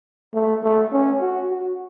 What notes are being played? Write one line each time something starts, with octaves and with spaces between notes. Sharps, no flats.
A3
A3
C#4
F#4
F#4